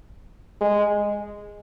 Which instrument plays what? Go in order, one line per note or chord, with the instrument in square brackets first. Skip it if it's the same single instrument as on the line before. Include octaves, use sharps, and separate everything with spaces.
[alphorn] G#3